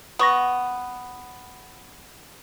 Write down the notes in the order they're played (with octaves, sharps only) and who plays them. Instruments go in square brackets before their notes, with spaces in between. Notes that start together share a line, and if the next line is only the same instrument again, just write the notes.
[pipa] B3 [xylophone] B4 C#6 A#6